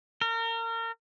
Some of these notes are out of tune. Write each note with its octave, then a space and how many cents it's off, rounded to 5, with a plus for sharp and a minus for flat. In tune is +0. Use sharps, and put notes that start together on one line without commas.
A#4 -30